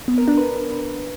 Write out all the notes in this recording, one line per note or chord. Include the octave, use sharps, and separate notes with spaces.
B3
A#4
D4
B4